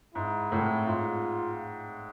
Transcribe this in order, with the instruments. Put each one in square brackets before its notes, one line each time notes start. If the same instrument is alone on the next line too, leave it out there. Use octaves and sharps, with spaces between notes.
[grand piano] G#2 [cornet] E4
[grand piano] A2
[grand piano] G#2 [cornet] F4